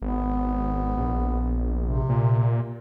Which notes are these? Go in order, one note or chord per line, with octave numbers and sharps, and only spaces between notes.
G#1 B3
A#1
C3
A#2